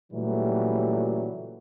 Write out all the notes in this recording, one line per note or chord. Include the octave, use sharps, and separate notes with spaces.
A#2 C#3 E3 F#3 G3 A3